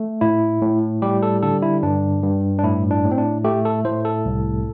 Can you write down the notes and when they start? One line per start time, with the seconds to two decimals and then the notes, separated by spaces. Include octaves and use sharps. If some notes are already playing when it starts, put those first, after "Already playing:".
Already playing: A3
0.21 A2 E4
0.61 A2
1.02 G3 G4
1.23 A4
1.43 D3 A4
1.63 E4
1.83 G2 D4
2.23 G2
2.59 D4
2.64 A2 E4
2.91 D4
3.04 A2
3.11 C4
3.18 D4
3.45 A3 G4
3.65 A4
3.85 A2 C5
4.05 A4
4.25 C2